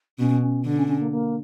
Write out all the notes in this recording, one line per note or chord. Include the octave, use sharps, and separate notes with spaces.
B2 C#4
C#4
D3 D4
C#4
C#4
A#3
A#3